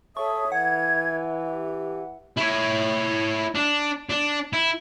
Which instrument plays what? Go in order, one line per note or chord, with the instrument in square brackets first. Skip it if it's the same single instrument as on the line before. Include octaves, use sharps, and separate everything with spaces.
[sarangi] A4 [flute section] C#5 E5 D#6 [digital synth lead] C#6
[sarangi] E3 [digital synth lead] F#5 [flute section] G#6
[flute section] G4
[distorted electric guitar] E4 C#5
D4
D4
E4